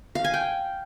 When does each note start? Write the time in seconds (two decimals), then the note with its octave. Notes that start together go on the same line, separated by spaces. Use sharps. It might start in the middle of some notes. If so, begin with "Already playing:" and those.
0.15 F5
0.24 G#5
0.34 G5